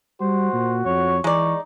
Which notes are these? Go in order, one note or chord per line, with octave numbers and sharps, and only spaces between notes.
G3 F#4 C5
A#2
F2 C#5
E3 G#3 D#4 D5 C#6